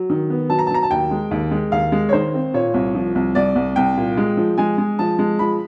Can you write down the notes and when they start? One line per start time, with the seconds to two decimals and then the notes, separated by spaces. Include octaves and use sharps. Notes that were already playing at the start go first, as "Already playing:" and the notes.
Already playing: F#3
0.10 D#3
0.30 B3
0.50 F#3 A5
0.59 A#5
0.67 A5
0.71 F#3 A#5
0.83 A5
0.91 D#2 G5
1.11 G#3
1.31 D#2
1.51 G#3
1.72 D#2 F5
1.92 G#3
2.09 C#5
2.13 D#3 C5
2.34 C4
2.54 A#2 C#5
2.74 C2
2.95 F3
3.15 C2
3.35 C2 D5
3.56 C2
3.76 C2 G5
3.97 A#2
4.17 G#3
4.37 F3
4.58 G#3 G#5
4.78 G#3
4.99 F3 A5
5.19 G#3
5.39 F3 B5